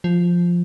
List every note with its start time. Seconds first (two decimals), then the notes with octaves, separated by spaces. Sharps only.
0.04 F3